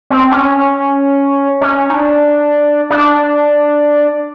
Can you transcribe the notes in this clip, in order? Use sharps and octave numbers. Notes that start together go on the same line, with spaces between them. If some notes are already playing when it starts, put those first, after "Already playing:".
C4
C#4
C#4
D#4
D4
D4